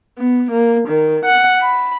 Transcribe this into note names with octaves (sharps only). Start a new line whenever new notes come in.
B3
A#3
D#3
F#5
B5